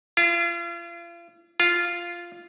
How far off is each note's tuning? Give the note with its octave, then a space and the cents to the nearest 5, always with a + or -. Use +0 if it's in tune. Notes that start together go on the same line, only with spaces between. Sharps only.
F4 -40
F4 -10